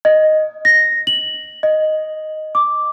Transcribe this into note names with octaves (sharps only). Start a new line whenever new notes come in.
D#5
A#6
F#7
D#5
D6